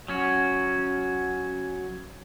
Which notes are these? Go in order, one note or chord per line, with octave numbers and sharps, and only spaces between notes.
F#3 C#4 F#4